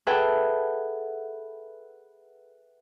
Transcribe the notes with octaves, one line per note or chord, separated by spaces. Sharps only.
G#4 A4 B4 E5 F#5 G5